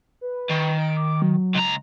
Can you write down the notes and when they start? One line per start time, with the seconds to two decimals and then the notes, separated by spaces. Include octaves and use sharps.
0.21 B4
0.51 D#3
0.79 D7
0.97 D6
1.22 F#3
1.55 C#2 A#5